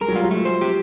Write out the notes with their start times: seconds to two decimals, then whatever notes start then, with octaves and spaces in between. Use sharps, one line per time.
0.01 G#3 A#4
0.08 F#3
0.12 G3
0.16 F4
0.23 F#3
0.31 F3 A3
0.45 F3 C5
0.61 G4